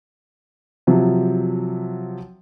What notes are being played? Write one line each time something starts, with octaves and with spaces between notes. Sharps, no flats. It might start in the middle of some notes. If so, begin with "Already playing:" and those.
C3 F3 F#3